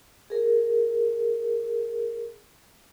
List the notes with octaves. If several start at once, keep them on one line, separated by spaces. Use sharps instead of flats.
G#4 A#4